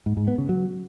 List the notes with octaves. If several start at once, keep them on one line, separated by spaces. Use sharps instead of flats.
G#2
G#2
B3
C#3
F#3